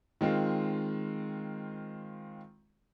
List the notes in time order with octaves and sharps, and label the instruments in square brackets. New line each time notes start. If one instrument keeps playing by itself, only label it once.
[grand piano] D#3 G#3 C4 F4